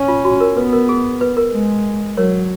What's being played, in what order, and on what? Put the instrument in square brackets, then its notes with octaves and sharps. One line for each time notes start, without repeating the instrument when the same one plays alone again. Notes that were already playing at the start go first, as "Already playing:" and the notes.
Already playing: [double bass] C#4
[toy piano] F4
F#4
A#4
[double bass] B3 [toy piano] B4
[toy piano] A#4
G#4
B4
A#4
[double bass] G#3
[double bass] F#3 [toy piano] A#4 C#5